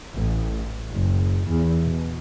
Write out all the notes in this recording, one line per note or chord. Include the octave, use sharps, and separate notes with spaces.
A1
F#1
E2
B2